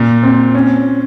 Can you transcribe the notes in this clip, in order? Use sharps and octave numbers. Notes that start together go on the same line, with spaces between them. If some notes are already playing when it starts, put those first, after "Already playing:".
Already playing: A#2
C4
C#4